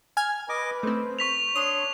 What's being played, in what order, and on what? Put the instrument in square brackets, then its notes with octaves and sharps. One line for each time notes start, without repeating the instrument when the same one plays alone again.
[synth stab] G#5 F6 G#6
[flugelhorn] B4 [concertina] D#5 D6
[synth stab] A3 C4 [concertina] C5
[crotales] C#6 B6 F7
[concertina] D4 C6 [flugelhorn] C#5 [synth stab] D#6 [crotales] F7